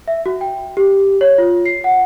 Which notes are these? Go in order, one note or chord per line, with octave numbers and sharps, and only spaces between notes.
E5
F#4
G5
G4
C#5
F4
C7
F#5